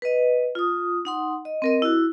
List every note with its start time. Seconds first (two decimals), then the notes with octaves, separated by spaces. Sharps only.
0.02 B4 D#5
0.55 F4 D#6
1.05 D#4 F#5 C6
1.45 D#5
1.62 C4 A#4 D#5
1.82 E4 F#4